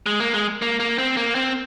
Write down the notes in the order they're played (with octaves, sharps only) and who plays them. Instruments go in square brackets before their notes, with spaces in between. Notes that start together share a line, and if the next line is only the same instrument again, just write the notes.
[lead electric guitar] G#3
A#3
G#3
A#3
A#3
C4
A#3
C4